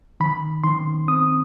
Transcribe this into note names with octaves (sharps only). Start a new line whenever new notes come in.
D#3 B5
D#3 C6
C4 D#6